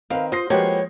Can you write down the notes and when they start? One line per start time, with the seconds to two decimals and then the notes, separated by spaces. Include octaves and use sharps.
0.10 D#3 C4 A#4 B4 F5
0.32 F4 C5 D#6 A#6 C7
0.50 F3 G#3 A#3 F#4 G4 B4 C#5